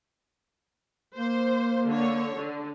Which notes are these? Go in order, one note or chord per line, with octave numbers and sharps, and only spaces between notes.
A#3 C5
D3 C#5
D3